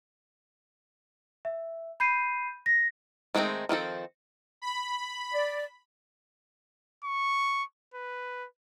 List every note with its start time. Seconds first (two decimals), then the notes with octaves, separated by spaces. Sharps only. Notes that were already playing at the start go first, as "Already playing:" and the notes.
1.45 E5
2.00 B5 G6 C7 D#7
2.66 A#6
3.35 D#3 G#3 A3 C4 D#4
3.69 D#3 F3 C4 A4
4.62 B5
5.32 D5
7.04 C#6
7.94 B4